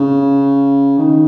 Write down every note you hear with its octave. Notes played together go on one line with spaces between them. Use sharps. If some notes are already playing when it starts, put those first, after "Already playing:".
Already playing: C#3
D#3